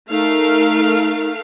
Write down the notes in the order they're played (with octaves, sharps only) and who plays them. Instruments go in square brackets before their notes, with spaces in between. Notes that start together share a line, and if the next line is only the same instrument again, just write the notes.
[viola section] A3 A#4 F5 [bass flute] D#4